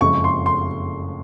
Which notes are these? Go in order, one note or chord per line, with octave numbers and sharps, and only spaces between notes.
F#1 F2 C#3 F3 G#3 C#6
C6
C6